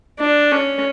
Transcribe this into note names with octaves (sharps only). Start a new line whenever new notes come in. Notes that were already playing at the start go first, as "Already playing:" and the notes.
D4
C#4